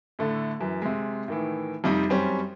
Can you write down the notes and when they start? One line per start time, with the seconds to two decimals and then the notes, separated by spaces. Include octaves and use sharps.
0.19 A2 D3 A3
0.60 F#2 E3
0.82 C3 G#3
1.28 A2 D#3 E3
1.84 F2 C3 G3 D#4
2.10 F#2 G3 C4 C#4